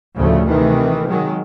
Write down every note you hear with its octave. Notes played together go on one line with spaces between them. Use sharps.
D2 A2 C#3 F3 A3
C3 D#3 E3 A3
D#3 F#3 G#3